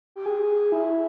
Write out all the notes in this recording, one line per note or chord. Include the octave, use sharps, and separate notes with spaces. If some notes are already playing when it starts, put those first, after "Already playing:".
G4
G#4
E4